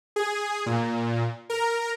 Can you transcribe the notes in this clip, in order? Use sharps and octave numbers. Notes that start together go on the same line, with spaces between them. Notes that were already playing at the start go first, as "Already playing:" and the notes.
G#4
A#2
A#4